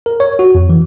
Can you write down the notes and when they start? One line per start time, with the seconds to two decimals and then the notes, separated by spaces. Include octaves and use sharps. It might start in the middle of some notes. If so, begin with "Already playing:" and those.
0.06 A#4
0.20 C#5
0.39 F#4
0.55 F2
0.69 E3